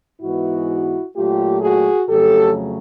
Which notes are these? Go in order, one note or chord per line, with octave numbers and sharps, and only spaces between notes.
G#2 E3 G#3 B3 E4 F#4
A#2 F#3 A3 F4 G4
F#4 G#4
F2 C#3 F#3 A3 G4 A4